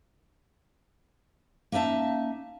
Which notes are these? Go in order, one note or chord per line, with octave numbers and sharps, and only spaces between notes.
A#3 C#4 D#4 E5 A5